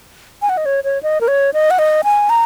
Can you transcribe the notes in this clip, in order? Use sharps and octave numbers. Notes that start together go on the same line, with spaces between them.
G#5
F#5
D#5
C#5
C#5
D#5
A#4
C#5
D#5
F#5
D#5
G#5
A#5